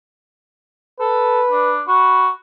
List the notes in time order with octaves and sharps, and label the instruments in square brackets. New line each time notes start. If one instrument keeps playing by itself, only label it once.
[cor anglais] A4 [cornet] B4
[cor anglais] D4
[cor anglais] F#4 [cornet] B5